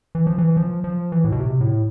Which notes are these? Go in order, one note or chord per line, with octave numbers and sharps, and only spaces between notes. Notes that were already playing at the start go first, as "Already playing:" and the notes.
E3
F3
E3
F3
F3
E3
A2
B2
C3
A2